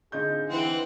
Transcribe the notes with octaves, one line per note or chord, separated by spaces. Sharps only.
D3 C4 D#4 F4 G#4 G6
E3 C4 F#5